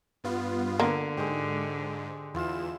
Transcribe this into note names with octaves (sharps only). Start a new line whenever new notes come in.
G2 B3 F4
D3 A#3
G#2 G#3 G4
E2 E4 F4 E7